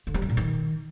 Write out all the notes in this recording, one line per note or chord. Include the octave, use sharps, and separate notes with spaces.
D3
G3
C#3
A#2
D#3